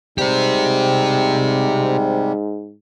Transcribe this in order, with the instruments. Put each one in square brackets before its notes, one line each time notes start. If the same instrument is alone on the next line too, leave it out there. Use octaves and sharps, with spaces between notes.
[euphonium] G#2 [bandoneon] C3 G3 [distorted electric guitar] G4 C5